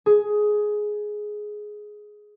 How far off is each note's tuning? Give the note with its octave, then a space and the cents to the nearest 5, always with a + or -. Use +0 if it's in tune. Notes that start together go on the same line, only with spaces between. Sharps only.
G#4 +10